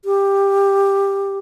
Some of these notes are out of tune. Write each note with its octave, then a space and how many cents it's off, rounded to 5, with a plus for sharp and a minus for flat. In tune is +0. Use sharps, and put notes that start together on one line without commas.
G4 +10